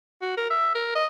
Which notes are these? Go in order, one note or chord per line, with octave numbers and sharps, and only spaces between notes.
F#4
A#4
E5
A#4
D#5